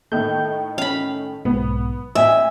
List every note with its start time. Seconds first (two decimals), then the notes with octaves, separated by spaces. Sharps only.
0.12 A2 D#3 A3 G6
0.78 C#4 F5 B5
1.45 B1 G#2 B3
2.15 A1 D#5 E5 G#5